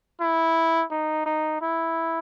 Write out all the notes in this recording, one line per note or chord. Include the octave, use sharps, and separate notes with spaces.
E4
D#4
D#4
E4